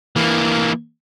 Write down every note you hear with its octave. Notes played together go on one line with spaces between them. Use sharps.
E3 A#3